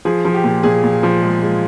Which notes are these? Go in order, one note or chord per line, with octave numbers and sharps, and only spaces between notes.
F3 G#4
F3
G4
A#2
A#2 G#4
A#2
F3
G#3
G#3